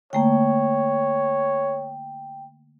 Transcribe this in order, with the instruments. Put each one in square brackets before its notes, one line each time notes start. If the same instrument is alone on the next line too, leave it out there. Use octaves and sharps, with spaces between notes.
[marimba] D3 A3 A#3 [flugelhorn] C#5 [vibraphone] G5